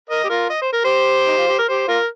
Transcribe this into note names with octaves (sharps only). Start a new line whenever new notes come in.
A#4 D#5
G4
F4 A#4
D#5
C5
A#4
G4 C5
D#4
F4
G4
A#4
G4 C5
F4 A#4